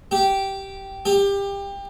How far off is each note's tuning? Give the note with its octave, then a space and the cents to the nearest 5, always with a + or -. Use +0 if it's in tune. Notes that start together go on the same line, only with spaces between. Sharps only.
G4 -10
G4 +25